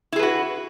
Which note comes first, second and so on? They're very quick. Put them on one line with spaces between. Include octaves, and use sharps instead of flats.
E4 G#4 B4 F#4